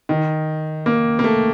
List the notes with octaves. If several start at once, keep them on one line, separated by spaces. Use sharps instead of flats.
D#3
A#3
A#3
A3